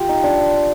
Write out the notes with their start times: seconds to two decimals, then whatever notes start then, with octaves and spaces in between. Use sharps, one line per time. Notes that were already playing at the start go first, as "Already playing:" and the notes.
Already playing: F4 G4
0.09 D#4
0.23 D4